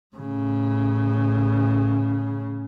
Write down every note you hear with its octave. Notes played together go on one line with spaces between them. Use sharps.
A2 C#3